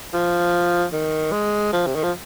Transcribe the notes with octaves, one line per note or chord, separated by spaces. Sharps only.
F3
D#3
G#3
F3
C3
D#3
F3